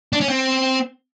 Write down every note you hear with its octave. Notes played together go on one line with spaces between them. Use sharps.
D4
C#4
C4